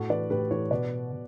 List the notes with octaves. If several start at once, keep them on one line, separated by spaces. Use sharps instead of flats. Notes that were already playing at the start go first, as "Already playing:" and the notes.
Already playing: A2 F#4 A4
E3 B4 D5
A2 G4 B4
E3 A4 C#5
B2 B4 D5
B2